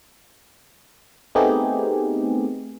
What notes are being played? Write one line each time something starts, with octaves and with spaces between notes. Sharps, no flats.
A3 B3 C4 D#4 G4 G#4